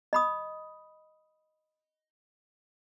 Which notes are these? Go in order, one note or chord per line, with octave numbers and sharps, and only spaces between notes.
D#5 B5 D#6